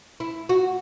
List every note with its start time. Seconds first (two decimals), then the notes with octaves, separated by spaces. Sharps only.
0.20 E4
0.49 F#4